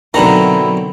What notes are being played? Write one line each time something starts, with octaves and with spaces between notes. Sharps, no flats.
B2 D3 D#3 F#3 C4 E4 A#5